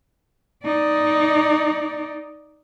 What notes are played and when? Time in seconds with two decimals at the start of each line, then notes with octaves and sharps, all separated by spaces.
0.64 D#4 D5